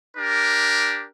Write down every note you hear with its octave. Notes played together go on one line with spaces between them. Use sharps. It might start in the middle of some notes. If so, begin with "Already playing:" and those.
D4 G4 A#4